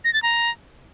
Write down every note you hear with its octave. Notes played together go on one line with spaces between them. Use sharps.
A#6
A6
A#5